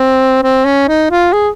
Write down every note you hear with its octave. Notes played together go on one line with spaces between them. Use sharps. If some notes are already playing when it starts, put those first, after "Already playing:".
Already playing: C4
C4
C#4
D#4
F4
G#4